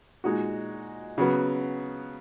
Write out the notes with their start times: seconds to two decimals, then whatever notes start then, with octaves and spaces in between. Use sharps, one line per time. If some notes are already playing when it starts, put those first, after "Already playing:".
0.24 A#2 G#3 D#4 F#4
1.18 C#3 F#3 B3